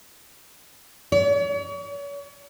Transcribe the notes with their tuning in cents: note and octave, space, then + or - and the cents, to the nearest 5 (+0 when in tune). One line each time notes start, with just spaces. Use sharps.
C#5 +40